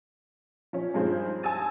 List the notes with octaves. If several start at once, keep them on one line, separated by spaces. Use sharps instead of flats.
F3 C#4
G2 F3 D#4 G#4 C5
G#5 A5 D#6 E6 A6 D#7